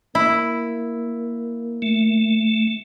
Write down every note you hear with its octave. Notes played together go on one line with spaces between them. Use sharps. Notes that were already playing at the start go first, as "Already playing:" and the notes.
A#3 E4
A3